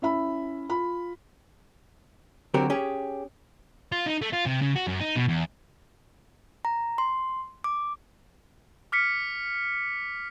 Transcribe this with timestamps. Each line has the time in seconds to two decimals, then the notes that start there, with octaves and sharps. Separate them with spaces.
0.02 C#4 E4 E5 B5
0.69 F4 B5
2.54 D3 F#3 C4 F#4 G4 A#4
2.70 C#4 G4 G#4
3.92 F4
4.06 D#4
4.22 A3
4.33 F4
4.46 C3
4.62 C#3
4.75 F#4
4.87 F#2
5.00 D#4
5.16 B2
5.29 E2
6.65 A#5
6.98 C6
7.64 D6
8.92 D6 F6 B6 C#7